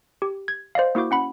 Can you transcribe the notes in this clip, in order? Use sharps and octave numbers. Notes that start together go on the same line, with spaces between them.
G4
G#6
C5 D5 D#5 F5
A#3 E4 F#4 D6 G6
C#4 F#5 B5